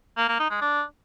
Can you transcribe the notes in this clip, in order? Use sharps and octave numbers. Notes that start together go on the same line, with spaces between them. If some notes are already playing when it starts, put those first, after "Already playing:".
A#3
A#3
D#4
G#3
D4